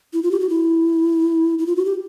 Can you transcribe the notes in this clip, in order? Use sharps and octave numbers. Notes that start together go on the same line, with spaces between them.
E4
F4
G4
F#4
E4
E4
F4
F#4
G4